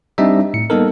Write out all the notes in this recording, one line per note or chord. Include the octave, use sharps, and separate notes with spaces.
G3 C4 D4 D#4 D#5 E5
A2 C#7
G3 A#3 B3 D#4 A4 A#4